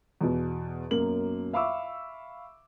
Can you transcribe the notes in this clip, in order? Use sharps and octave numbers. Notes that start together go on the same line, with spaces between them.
E2 B2
B1 F#2 A#3 F#7
E5 F5 B5 C#6 D6 E6